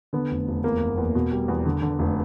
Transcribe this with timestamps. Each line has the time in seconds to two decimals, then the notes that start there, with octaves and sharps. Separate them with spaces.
0.13 D3 B3
0.31 F1
0.48 F1
0.64 E2 A#3
0.81 F#1
0.98 E2
1.15 B2
1.32 G3
1.48 E2
1.66 D3
1.82 D3
1.99 F1